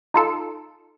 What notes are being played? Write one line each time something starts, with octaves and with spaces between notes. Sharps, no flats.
D#4 F4 A4